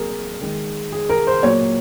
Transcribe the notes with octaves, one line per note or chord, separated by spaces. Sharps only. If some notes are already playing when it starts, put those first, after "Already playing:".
Already playing: C3 F#3 A#3 G#4 A#4
D#3 G#3
G#4
A#4
C5
A#2 F#3 A#3 C#5